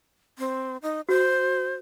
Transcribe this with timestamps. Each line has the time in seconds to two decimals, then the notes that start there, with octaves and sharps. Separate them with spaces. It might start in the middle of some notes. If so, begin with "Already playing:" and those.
0.39 C4
0.82 D#4
1.09 F#4 C5